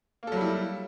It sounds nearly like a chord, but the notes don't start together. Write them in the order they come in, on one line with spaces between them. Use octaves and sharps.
A#3 A4 F#3 G3 E4